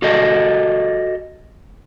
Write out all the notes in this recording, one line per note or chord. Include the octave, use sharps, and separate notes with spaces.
F#4 G4 A4 D5 D#5